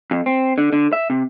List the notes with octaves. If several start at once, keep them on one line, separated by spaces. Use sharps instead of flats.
F2
C4
D3
D3
E5
C3